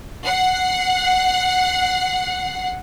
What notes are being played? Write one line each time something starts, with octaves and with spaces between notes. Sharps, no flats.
F#5 C7